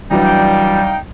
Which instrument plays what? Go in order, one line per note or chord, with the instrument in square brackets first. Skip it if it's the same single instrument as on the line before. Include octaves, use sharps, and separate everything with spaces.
[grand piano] E3 F#3 D4 [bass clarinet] G3 [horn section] D#4 F5 G5